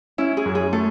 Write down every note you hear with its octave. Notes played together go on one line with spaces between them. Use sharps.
C#4 E4
G#4
F#2
G#4
A3 A4